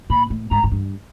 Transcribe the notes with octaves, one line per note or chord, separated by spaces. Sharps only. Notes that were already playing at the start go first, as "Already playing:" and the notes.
A#2 B5
A2
G#2 A#5
G#2
G2